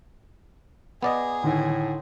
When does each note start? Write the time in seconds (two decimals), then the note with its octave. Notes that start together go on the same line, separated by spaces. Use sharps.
1.03 B3 G#4 D5 D#5
1.44 A2 D3 D#3 D#4